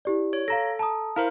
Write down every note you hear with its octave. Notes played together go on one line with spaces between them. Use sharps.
E4 G4 D5
C#5
A4 F5 A#5 A#6
A5 A#5 D#6
E4 A#4 C5 F5 A#5